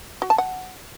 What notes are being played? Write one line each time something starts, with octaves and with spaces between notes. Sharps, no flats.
F#4
A5
F#5